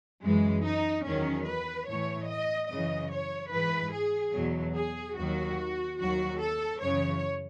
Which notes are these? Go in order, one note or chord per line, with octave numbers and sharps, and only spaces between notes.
F#2 E3 G#3
D#4
E2 D#3 F#3 C#4
B4
A2 E3 C#5
D#5
F#2 C#3 E3 D#5
C#5
G#2 E3 B4
G#4
E2 B2 F#3
G#4
D#2 D#3 F#3 F#4
D#2 D#3 F#3 F#4
A4
F#2 C#3 E3 C#5